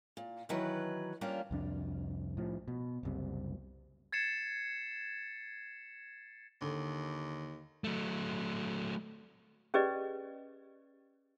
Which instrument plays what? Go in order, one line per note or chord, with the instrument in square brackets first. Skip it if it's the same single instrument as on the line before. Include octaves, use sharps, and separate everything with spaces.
[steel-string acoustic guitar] A#2
D#3 E3 F#3 B4
G3 A#3 C#4 D4 F4
[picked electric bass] C2 F2 D4
A2 F3
B2
F#1 C2 C3
[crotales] G#6 A6 C7 C#7 E7
[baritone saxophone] D#2 [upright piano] D3
[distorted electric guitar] F#3 A3
[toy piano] C#4 G4 G#4 B4 D5 D#5